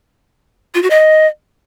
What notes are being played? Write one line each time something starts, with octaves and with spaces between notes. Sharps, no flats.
F4
F#4
D#5